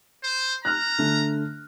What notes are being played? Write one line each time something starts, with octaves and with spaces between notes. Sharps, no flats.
C5
A#5 F6 F#6
D3 A3